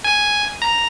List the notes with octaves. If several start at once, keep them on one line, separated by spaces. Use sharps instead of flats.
G#5
A#5